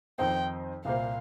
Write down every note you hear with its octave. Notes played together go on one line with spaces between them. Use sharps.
F2 D#3 C4 D#4 C5 G5
C2 A#2 A#3 F4 C5 F5